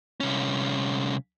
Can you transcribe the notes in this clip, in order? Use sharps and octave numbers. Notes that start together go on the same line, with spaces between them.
C2 C#4